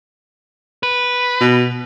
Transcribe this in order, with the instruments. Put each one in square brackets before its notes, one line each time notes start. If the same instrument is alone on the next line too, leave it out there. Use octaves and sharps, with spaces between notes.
[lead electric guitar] B4
[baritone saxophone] B2